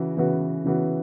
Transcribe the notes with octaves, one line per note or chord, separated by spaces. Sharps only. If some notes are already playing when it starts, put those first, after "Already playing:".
Already playing: C#3 E3 F#4
C#3 E3 B3 F#4
C#3 E3 B3 F#4